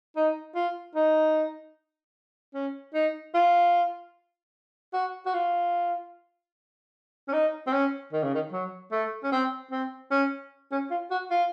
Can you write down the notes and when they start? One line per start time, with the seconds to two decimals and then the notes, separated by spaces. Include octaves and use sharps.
0.17 D#4
0.55 F4
0.95 D#4
2.54 C#4
2.94 D#4
3.34 F4
4.94 F#4
5.26 F#4
5.34 F4
7.28 C#4
7.33 D#4
7.67 C4
7.72 C#4
8.13 D#3
8.23 C#3
8.35 D#3
8.52 F#3
8.92 A3
9.24 C#4
9.32 C4
9.71 C4
10.11 C#4
10.72 C#4
10.91 F4
11.11 F#4
11.31 F4